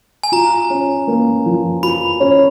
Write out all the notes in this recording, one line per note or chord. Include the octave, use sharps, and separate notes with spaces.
G#5
F4 A#5
C#4
A#3
F3
F4 B5
C#4